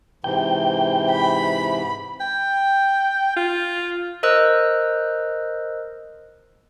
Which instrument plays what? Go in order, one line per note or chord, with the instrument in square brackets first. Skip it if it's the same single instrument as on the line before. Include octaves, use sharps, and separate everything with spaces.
[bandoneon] G#2 C3 E3 [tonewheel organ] G5
[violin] B5
[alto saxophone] G5
F4
[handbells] A#4 C5 D#5 E6 F#6